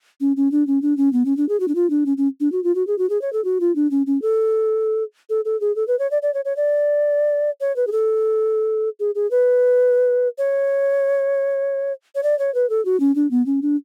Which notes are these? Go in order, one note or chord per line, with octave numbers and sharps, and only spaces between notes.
C#4
C#4
D4
C#4
D4
C#4
B3
C#4
D4
G#4
F#4
D4
F4
D4
C#4
C#4
D4
F#4
F4
F#4
G#4
F#4
G#4
C#5
A4
F#4
F4
D4
C#4
C#4
A4
A4
A4
G#4
A4
B4
C#5
D5
D5
C#5
C#5
D5
C#5
B4
G#4
A4
G#4
G#4
B4
C#5
C#5
D5
C#5
B4
A4
F#4
C#4
D4
B3
C#4
D4